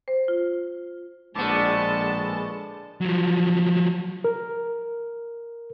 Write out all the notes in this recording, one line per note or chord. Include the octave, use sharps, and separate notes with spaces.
C5
F4
A#1 A2 D3 G#3 B3 A5 C6 D6
F3 F#3
A#4